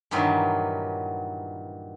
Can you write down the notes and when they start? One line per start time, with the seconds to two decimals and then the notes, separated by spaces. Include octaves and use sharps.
0.11 G2 A#2 D#3 E3 F#3